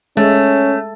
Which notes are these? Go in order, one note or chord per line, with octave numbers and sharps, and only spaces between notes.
G#3 A3 C#4